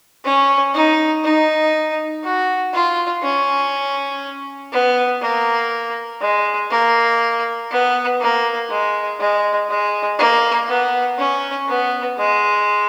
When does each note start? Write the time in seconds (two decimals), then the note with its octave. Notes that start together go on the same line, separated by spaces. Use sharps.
0.24 C#4
0.74 D#4
1.24 D#4
2.24 F#4
2.73 F4
3.23 C#4
4.72 B3
5.22 A#3
6.21 G#3
6.71 A#3
7.71 B3
8.20 A#3
8.70 G#3
9.20 G#3
9.69 G#3
10.19 A#3
10.68 B3
11.18 C#4
11.68 B3
12.18 G#3